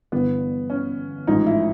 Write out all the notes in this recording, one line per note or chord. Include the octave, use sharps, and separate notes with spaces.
G1 G2 E3 B3
C#4
A1 G#2 F3 D#4
E4